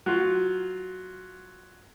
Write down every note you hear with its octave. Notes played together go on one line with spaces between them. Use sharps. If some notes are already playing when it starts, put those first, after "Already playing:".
F#3 F4